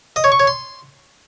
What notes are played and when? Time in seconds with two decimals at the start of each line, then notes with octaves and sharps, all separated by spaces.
0.16 D#5
0.24 C#5
0.32 C#6
0.40 C#5
0.47 C6